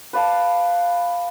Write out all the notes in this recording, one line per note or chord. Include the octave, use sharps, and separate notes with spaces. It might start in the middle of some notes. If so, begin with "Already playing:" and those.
B4 D5 F5 A5